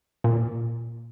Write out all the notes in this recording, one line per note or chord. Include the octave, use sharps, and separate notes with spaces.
A#2